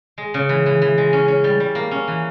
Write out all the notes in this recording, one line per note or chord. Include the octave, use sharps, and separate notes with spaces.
G#3
C#3
E3
E3
E3
G#3
C#4
C#4
G3
G3
A#3
C#4
E3